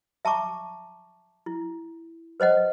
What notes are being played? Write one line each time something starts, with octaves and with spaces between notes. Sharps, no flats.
E5 A5 A#5 C#6 D6
E4
B4 C5 D#5 F#5